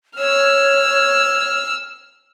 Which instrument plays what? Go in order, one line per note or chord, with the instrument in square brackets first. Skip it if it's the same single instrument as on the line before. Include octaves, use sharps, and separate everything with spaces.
[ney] C#5 [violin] E6 F6